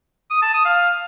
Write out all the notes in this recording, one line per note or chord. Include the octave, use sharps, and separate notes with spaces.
D#6
A5
D#6
F5